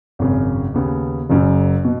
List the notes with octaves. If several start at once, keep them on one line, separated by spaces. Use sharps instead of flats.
G#1 F#2 C#3
D#2 C#3 B3
F#1 F#2 C#3 F#3
B2